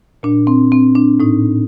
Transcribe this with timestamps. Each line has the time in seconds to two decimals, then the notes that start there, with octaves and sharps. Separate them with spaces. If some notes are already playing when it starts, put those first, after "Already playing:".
0.23 A#2 D4
0.47 C4
0.72 C4
0.95 D4
1.20 A2 D#4